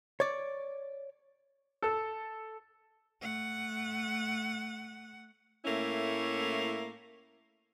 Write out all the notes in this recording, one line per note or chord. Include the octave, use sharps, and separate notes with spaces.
C#5 D5
A4 E6
A3 F#5
A2 A3 A#3 C#4 E4